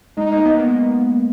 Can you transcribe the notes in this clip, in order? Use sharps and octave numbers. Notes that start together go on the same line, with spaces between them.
G#3 D#4
A#3
B3
A#3
G#3